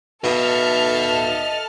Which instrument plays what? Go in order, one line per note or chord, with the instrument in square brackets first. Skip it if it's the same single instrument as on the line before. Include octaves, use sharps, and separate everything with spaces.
[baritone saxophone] B2 [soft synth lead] D#4 [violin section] A4 A5 F6 [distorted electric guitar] D#5 E5